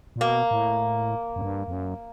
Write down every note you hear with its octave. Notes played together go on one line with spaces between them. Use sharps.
A#2
B2 A#3
A2
F#2
G2
F2
F#2